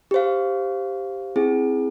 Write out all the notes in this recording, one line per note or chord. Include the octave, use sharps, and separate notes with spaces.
G4 C5 F5
C4 E4 G#4